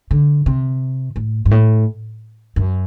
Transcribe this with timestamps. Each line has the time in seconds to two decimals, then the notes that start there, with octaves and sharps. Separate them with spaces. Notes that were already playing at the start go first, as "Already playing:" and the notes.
0.11 D3
0.46 C3
1.16 A2
1.45 G2
1.51 A2
2.56 F#2